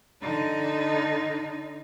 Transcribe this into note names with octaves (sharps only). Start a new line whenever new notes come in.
D3 D#4